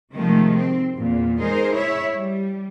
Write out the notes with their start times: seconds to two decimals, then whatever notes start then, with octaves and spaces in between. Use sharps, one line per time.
0.13 C3 D#3 F3 G#3 A3
0.55 C4
0.95 E2 A#2
1.39 G#3 D#4 G#4 A#4 C5
1.72 E4 C#5 E5
2.15 G3